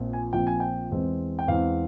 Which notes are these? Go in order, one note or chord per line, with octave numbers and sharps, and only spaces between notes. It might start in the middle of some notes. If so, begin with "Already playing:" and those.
Already playing: A#1 A#2 F3 C4
G#5
A#1 A#2 F3 C4 G5
G#5
G5
E2 E3 G#3 C4
G5
E2 E3 G#3 C4 F5